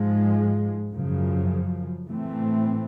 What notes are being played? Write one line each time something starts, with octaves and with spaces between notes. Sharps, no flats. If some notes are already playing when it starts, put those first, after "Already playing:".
Already playing: G#2 F3 G#3
F#2 C#3 F3
A2 E3 A3 C4